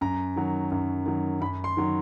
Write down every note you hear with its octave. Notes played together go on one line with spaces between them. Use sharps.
F#2 A#5
D#3 F#3
F#2
D#3 F#3
F#2 B5
C6
D#3 F#3